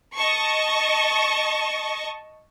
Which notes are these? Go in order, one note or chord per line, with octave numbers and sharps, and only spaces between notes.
D#5 A5 C#6